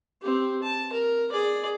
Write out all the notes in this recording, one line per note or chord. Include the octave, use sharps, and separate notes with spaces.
C4 G4
A5
A#4
G#4 D5